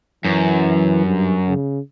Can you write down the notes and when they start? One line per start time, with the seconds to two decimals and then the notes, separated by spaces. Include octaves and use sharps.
0.24 F#2 E3
1.05 G2
1.48 C#3